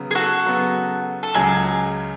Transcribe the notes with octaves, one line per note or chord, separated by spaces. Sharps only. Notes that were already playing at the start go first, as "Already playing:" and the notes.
Already playing: C#3 F#3 B3
G#4
F#4 A4
C#3 F#3 B3
A4
C#2 C#3 F#3 G#4